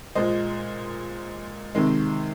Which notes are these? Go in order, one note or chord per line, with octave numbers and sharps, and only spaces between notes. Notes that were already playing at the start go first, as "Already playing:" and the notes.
A#2 G#3 C5 D#5
C3 D#3 G#3